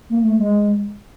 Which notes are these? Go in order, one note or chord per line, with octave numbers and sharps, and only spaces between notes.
A#3
A3
G#3